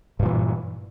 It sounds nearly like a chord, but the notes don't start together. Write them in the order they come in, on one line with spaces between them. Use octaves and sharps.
G2 A#2 E3